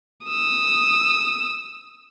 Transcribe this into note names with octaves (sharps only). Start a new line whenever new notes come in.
D#6 E6